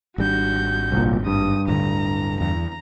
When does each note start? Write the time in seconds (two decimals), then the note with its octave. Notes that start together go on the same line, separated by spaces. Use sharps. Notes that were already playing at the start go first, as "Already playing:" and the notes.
0.18 G#1 G3 D4 F#4 G6
0.92 C2 A#2
1.27 G2 D#6
1.68 D1 D3 A#5
2.41 E2 A#5